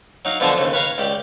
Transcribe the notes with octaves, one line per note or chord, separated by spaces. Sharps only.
F#3 D#4 F5
B2 D3 F3 F4 G#4 A4
D#2 C#3
B4 C#5 F5 A#5 B5
C#2 G4 D5